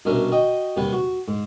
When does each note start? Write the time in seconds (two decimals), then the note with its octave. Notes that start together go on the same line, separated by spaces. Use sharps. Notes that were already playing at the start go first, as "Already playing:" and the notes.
0.05 C2 B2 C#4 D4 A#4 E5
0.32 F#4 D#5 G5
0.77 D#2 C3 G3 B4 F#5
0.93 F#4
1.28 G#2